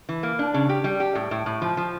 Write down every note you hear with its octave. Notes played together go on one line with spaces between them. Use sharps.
E3
A#3
D4
C#3
G4
G3
G4
A2
A2
A2
F3
F3